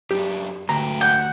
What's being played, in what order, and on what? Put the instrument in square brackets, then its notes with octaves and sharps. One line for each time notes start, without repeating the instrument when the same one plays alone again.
[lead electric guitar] F#2 D4 [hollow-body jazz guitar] G4
[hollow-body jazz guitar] D2 A#5 [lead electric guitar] G#2 G4
[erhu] F#5 [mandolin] G6